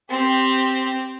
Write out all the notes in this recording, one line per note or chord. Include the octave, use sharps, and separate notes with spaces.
C4 G4